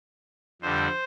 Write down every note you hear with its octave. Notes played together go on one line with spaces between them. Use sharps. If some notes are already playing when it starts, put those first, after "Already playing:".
F2 D3 G3 C5